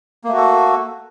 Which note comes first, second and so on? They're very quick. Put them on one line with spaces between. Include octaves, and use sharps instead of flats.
A#3 A3 F#4 A4